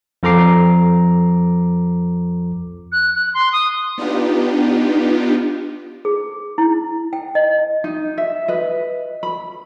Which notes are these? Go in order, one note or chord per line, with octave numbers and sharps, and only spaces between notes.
F2 F3 A4 A#5 D6 C7
F#6
F#6
C6
D#6
B3 D4 D#4 F4 G4
G#4
E4
G5
D#5
D#4
E5
B4 D#5
B5